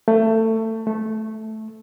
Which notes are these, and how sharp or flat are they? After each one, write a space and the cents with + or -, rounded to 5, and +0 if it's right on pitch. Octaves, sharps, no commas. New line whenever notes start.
A3 +20
A3 -10